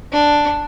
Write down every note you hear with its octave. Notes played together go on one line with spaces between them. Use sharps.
D4